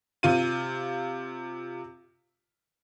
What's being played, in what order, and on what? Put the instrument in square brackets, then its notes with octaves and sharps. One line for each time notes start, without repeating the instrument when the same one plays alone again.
[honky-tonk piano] C3 F4 D#7